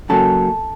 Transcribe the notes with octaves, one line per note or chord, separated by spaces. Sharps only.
F#2 C#3 F#3 A3 A#3 A4